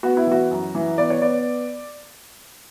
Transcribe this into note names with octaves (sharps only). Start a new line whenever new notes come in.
B3 F#4
E4
E3 F#4
F#2
E3
B3 D5
C#5
B3 D5